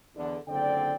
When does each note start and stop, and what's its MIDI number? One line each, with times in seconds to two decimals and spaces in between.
0.15 0.37 40
0.15 0.37 50
0.48 0.94 30
0.48 0.94 50
0.48 0.94 60
0.48 0.94 74
0.48 0.94 79